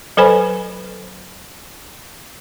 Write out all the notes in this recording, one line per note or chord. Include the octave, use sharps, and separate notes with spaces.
F#3 A4 B4 C5 G#5 B5